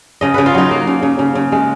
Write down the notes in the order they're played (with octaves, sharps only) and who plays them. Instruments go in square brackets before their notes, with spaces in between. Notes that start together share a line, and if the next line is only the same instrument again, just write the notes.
[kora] C#3 D#5
C#3 B4
F4
F#3 D#4
A#3
C#3
C#3
C#3
C#3
G#3